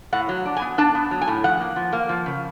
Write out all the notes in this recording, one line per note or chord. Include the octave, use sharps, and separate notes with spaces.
A2 F#5
F#3
D4
G#5
B3
D4 A5
B3
F#3
G#5
A2
F3 F#5
A#3
F3
A#3
F3
C#3